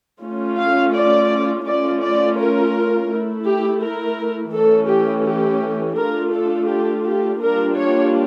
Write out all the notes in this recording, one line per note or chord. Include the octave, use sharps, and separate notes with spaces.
A3 C#4 F4
F5
D5
A3 C#4 F4 D5
D5
A#4
A3 E4
G4
A#4
E3 A3 C#4 A4
G4
G4
A3 D4 F4 A#4
A4
G4
G4
G3 A#3 D4 F4 A#4
C#5